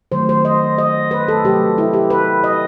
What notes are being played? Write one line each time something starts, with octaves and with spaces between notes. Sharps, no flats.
D#3 F#3 A3 C5
C5
D#5
D#5
B4
A4
C3 F#3 A3 G4
E4
G4
B4
D#5